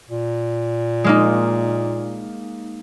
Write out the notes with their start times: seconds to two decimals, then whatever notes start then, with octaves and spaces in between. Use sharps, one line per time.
0.09 A#2
1.04 G#3 A#3 D#4